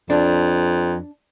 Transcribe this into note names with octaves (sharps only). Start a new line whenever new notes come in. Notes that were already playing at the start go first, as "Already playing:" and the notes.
F2 D4